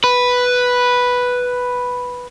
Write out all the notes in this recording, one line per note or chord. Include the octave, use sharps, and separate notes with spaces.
B4